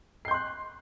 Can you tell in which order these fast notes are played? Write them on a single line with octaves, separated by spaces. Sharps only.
C7 G6 C6 F#6